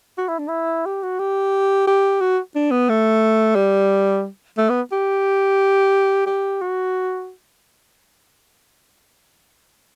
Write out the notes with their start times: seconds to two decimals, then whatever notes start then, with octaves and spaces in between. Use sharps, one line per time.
0.18 F#4
0.29 E4
0.39 D4
0.48 E4
0.86 G4
1.03 F#4
1.19 G4
1.87 G4
2.20 F#4
2.55 D4
2.71 B3
2.89 A3
3.56 G3
4.58 A3
4.70 B3
4.92 G4
6.26 G4
6.61 F#4